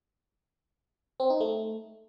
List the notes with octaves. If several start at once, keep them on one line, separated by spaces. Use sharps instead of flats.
C4
D#4
A3